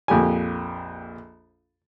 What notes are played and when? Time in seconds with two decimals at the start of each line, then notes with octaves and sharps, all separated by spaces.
0.08 A#1 F2 G4 G#5